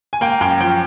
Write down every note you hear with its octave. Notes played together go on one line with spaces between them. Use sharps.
G#5
A#3 G5
F#2 G5
F3 G5